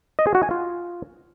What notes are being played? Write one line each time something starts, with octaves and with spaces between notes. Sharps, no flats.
D#5
G#4
F#4
G#5
F4